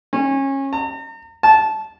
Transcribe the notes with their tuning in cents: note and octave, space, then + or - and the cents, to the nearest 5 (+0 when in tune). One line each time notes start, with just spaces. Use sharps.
C#4 -25
A#5 -40
A5 -15